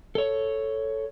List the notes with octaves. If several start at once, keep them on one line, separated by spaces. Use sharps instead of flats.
A4 C#5